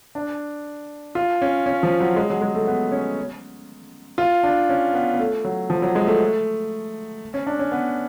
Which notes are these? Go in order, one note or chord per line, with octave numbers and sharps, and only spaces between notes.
D4
F4
C#4
C#4
F3
F#3
G#3
F#3
G#3
A3
B3
C#4
F4
D4
C#4
B3
B3
A3
F#3
F3
F#3
G#3
A3
C#4
D4
C#4
B3